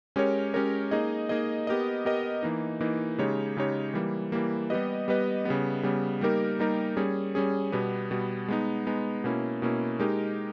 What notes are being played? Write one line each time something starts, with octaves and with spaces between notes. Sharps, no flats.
G#3 C#4 G4 A#4 C#5
G#3 C#4 G4 A#4 C#5
A#3 D#4 G#4 D#5
A#3 D#4 G#4 D#5
B3 G4 A#4 D#5
B3 G4 A#4 D#5
E3 A#3 D#4
E3 A#3 D#4
C#3 G#3 D#4 G4 C#5
C#3 G#3 D#4 G4 C#5
E3 G3 A#3
E3 G3 A#3
G3 B3 G4 B4 D#5
G3 B3 G4 B4 D#5
C#3 G3 B3
C#3 G3 B3
G3 A#3 D#4 G4 A#4
G3 A#3 D#4 G4 A#4
G3 C#4 G#4
G3 C#4 G#4
B2 G3 B3
B2 G3 B3
G#3 B3 D#4
G#3 B3 D#4
B2 A#3 C#4 E4
B2 A#3 C#4 E4
G#3 D#4 G4 A#4